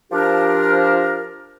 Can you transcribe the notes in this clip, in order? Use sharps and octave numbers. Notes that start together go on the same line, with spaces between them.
F3 D4 G4 A#4